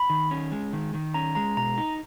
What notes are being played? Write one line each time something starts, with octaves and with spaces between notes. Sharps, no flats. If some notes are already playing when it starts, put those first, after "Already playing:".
Already playing: B5
D#3
C#4
G#3
D#3
D#3
C#4 A#5
G#3 A#5
B2 A#5
D#4